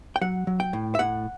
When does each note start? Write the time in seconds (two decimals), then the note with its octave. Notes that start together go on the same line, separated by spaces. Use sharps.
0.16 G5
0.21 F#3 F#5
0.47 F#3
0.60 G5
0.73 A2
0.95 E5
0.99 A2 F#5